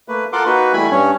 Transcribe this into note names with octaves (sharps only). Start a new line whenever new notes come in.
A3 A#3 B4
F4 A4 A#4 F#5 C6 D6
A#3 D#4 F#4 B4
E2 G3 A3 E4 G#5 B5
G2 C#4